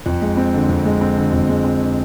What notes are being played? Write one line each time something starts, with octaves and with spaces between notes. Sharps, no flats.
F2
G#3
C4
D3
F2
G#3
C4
D3
F2
G#3
C4
D3